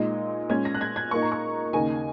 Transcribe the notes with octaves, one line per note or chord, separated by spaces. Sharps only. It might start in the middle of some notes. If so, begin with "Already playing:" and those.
Already playing: A#2 G#3 D#4
A#2 G#3 C#4 G#6
A#6
F#6
G#6
G#6
A#2 A#3 D#4 C#6
A#5
C#6
D#2 C#3 A#3 D#4 G#5